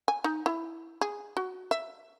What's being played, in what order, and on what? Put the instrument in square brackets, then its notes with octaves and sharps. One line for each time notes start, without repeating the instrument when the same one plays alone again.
[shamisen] G#5
D#4
E4
G#4
F#4
E5